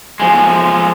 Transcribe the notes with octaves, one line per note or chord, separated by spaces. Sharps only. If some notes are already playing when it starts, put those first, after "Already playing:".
F3 G#3